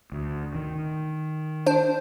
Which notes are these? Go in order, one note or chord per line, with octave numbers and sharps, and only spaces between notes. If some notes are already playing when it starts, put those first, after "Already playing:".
D2
D#3
D4 C5